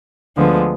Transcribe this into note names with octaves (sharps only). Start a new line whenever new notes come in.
D2 D3 F3 G#3 B3